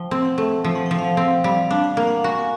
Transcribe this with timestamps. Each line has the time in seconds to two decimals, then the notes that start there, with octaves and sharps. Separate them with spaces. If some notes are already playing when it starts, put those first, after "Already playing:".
Already playing: F3 G5
0.11 C4
0.25 F#5
0.38 A3
0.64 F3 G5
0.75 F#5
0.86 F3 G5
0.99 F5
1.04 F#5
1.17 C4
1.44 G3 F5
1.71 D4
1.84 F#5
1.95 A#3 F5
2.07 F#5
2.24 F#4 G#5
2.40 G#5